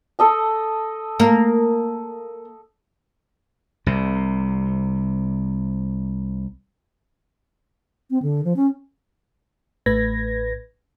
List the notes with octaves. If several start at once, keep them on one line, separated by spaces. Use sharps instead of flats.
A4 D#5 A5
A#3
C2 C3
C4
D3
F3
C#4
A1 A2 A3 B4 G#6 A#6